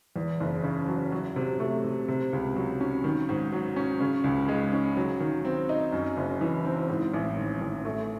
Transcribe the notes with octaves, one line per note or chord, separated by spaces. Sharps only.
E2
F#1
C#3
F#3
F#3
C3
A3
C3
C3
C#2
F#3
C#4
D#3
G#2
F#3
C#4
C#3
C#2
G#3
C#4
F#3
D#3
C4
D#4
F#2
F#1
E3
C4
G#2
A1
D#3
A1
A3